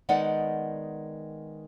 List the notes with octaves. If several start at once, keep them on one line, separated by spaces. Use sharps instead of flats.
D#3 G#3 B3 D#4 D5 F#5